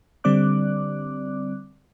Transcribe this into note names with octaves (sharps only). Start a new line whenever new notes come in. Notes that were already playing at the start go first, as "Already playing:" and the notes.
D3 G3 C4 D5 D6 F#6